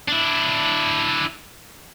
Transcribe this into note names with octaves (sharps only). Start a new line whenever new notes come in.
D4 E4